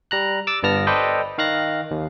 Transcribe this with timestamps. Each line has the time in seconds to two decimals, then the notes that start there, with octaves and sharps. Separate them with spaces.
0.11 G3 A#5 F#6
0.47 D6 E6 A6
0.63 G1 G2 B3 A5 F6 A#6
0.87 A4 B4 C5 D5 D#5 G5
1.38 D#3 F5 F#6 A#6
1.91 D#2